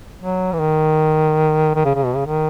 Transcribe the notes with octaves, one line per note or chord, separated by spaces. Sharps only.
F#3
E3
D#3
D#3
C#3
C#3
B2
C#3
D#3